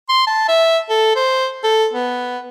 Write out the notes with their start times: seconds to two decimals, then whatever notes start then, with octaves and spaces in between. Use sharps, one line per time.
0.09 C6
0.27 A5
0.48 E5
0.90 A4
1.16 C5
1.64 A4
1.93 B3